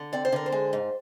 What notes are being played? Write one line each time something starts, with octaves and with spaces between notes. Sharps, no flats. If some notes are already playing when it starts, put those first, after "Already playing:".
Already playing: D3
C4 D5
C5
D3 A#4
C5
G#3
G#2